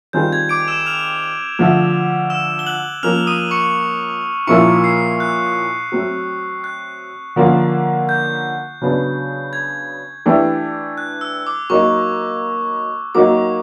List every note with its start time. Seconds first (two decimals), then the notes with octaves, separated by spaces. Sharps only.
0.13 D#3 G3 C4 F4 G#4 G6
0.33 G#6
0.49 D6 D7
0.68 E6 E7
0.86 F6 F7
1.59 D3 F3 A3
2.30 E6 E7
2.59 G7
2.67 F#6 F#7
3.03 F3 A#3 C#4 F6 F7
3.27 D#6 D#7
3.51 C#6 C#7
4.47 A#2 F3 A#3 C#4 E4 C#6 C#7
4.84 C7
5.20 F#6
5.92 F#3 A3 C4
6.64 F#6
7.36 D3 F3 A#3 C#4 F4
8.09 G6
8.81 C#3 F#3 B3 D4
9.53 G#6
10.26 E3 A3 D4 G4
10.98 F#6
11.21 E6
11.47 D6
11.70 F#3 A#3 D#4 C#6
13.15 F#3 A#3 D#4 F#4 D6